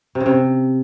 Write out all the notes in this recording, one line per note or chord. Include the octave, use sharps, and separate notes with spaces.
C3
C#3
C3